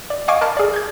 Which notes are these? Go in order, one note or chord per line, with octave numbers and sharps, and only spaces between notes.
D5
D#5 F5 G#5 C#6 D6 D7
A#4 A5 B5 F6
G#4 D5
G6 G#6